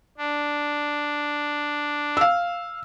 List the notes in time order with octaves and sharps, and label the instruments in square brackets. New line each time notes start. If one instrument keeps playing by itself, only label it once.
[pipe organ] D4
[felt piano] F5 E6